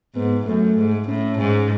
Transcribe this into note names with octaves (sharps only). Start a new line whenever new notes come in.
G#2 B3
F#2 A3
G#2
A2 C#4
G#2